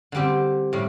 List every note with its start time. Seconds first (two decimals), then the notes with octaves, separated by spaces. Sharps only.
0.12 D3 G3 C4 G4
0.73 A2 G3